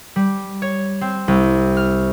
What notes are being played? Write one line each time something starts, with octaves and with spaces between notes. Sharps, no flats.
G3
C#5
C4
C2
F6